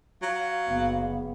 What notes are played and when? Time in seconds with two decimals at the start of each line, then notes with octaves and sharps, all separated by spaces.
0.22 F#3 F5
0.68 F#1 B3